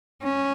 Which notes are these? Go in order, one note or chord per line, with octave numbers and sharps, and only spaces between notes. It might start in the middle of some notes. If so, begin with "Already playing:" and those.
C#4